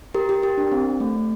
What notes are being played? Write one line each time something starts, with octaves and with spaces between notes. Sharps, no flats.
G4 A#4
G4
G4 A#4
D4
C4
A3